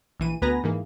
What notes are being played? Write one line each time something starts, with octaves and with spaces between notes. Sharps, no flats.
A#1 E3 D#7
D2 B3 B4 G#5 A#5 A#6
G#2 E3 A#3